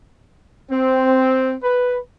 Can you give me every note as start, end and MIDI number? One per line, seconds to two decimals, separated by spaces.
0.71 1.55 60
1.64 1.97 71